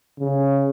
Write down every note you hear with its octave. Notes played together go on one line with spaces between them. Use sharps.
C#3